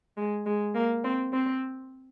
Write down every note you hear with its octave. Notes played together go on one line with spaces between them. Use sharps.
G#3
G#3
A#3
C4
C4